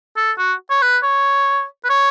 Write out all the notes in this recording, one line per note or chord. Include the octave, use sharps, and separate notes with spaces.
A4
F#4
C#5
B4
C#5
B4
C#5